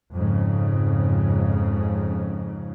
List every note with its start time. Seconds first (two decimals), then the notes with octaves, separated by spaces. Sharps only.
0.12 F2 G#2 C#3